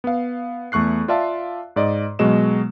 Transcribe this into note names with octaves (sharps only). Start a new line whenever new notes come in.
B3 F5
E2 A3 C#6 F#6 C7
F4 D5 E5 F5 A5
G#2 D5 D#5
B2 F#3 G#3 D#5 E7